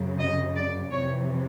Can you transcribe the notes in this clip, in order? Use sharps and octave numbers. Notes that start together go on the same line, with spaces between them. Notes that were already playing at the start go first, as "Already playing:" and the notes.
Already playing: F#2 C#3 F#3
D#5
D5
F2 C3 E3 C#5